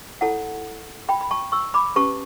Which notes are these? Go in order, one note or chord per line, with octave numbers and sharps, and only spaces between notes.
E4 A4 C#5 F#5 A5
G5 B5
B5
A5 C#6
C#6 E6
B5 D6
C#4 G4 B4 A5 C#6